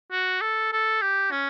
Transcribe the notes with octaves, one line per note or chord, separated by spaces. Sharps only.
F#4
A4
A4
G4
C#4